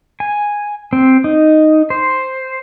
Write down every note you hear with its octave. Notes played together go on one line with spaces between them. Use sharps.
G#5
C4
D#4
C5